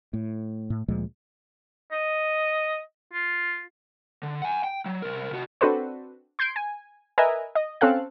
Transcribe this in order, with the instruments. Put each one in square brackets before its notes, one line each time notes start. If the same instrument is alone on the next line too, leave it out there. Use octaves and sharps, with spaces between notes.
[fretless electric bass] A2
A2
D2 A#2 F3 G#3
[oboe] D#5
F4
[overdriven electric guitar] D3
F#5 G#5
G5
F#3
C2 A#4
C3 F#4
[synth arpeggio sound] C4 D4 F#4 A4 B4 C5
C6 G6 G#6 C7 D7
G#5
A#4 B4 D#5 E5 G#5 A#5
D#5
C4 C#4 A4 F5 F#6